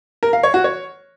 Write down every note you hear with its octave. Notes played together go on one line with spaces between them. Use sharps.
A#4
F5
C#5
F#4
C#5